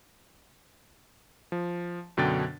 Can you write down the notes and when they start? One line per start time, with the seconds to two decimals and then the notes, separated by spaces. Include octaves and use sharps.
1.52 F3
2.17 F#2 B2 D3 D4 G5 A6